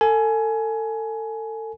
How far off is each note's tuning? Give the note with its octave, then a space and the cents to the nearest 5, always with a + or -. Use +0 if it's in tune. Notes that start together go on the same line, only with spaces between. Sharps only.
A4 +30 G#5 +20